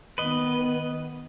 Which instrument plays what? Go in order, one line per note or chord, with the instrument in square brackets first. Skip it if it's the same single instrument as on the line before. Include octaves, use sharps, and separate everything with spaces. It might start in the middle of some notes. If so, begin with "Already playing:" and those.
[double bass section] D#3 B3 [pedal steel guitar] B4 D#5